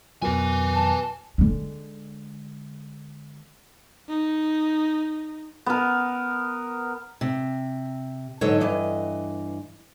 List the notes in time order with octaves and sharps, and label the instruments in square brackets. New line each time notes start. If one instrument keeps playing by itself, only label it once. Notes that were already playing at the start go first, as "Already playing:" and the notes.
[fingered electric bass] F2 F#3 [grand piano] B2 A#4 [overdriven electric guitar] B4 G#5
[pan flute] A5
[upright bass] D3 G#3
[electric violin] D#4
[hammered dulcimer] B3 A#4
[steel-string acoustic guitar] C3
G#2 D3 F#3 A4 C#5 D#5
G2 E3 D#5